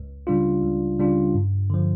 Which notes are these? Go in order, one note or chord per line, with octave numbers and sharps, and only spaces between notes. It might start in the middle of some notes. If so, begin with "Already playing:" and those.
Already playing: C#2
C#3 G3 D4 F4
C#2
C#3 G3 D4 F4
G2
D3 F3